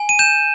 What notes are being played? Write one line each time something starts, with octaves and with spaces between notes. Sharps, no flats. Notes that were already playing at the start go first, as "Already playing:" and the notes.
Already playing: G#5
D#7
G6 E7